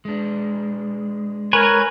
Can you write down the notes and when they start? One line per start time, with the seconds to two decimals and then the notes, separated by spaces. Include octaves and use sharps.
0.05 G#3 D4
1.53 A#4 B4 C#5 G#5